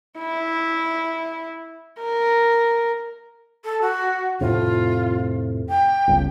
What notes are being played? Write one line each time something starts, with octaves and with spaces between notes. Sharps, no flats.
E4
A#4
A4
F#4
F2 A2 C3 F4
G5
G1 C#2